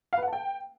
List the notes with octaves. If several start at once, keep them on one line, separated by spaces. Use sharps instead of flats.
F5
B4
F#5
A5
G5